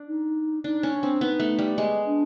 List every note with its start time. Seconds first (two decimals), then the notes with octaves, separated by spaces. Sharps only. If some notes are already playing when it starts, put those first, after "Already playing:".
Already playing: D4
0.08 D#4
0.64 D4 D#4
0.83 C#4
0.93 D4
1.03 C4
1.21 B3 D#4
1.40 A3
1.59 G3
1.78 G#3
2.06 D4